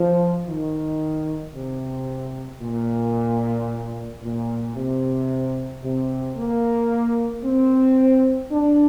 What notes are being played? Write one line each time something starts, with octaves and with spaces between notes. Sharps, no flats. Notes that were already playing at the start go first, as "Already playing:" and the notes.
Already playing: F3
D#3
C3
A#2
A#2
C3
C3
A#3
C4
D4